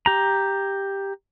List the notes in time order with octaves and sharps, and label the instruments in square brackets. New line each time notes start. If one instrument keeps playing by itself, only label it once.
[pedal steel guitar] G4 A#5